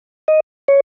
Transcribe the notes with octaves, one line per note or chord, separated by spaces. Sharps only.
D#5
C#5